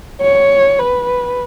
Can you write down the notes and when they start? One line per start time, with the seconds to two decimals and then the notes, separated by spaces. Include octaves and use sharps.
0.21 C#5
0.79 B4